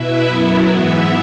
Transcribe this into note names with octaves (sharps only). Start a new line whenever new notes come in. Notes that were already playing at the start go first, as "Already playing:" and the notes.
Already playing: B2 B3 E4 E5
F#2 F#3 B3 E4
G#2 E3 B3 E5